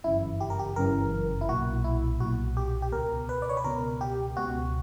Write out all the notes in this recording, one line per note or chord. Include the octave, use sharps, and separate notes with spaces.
G1 F#2 C#3 E3 E4
G4
A#4
G4
G1 F#2 C#3 E3 A#4
E4
B1 A#2 F#4
E4
B1 A#2 F#4
G4
G4
C#2 B2 A#4
B4
D5
C#5
B4
C#2 B2 A#4
G4
C#2 B2 F#4